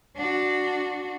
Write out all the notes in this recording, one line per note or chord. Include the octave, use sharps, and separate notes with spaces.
D4 F#4